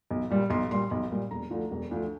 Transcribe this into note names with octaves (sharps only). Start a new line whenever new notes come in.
B1
A#2 G3
B1 C6
A#2 G3 C6
B1 B5
A#2 G3
E1 A#5
D2 D3 F3
E1
D2 D3 F3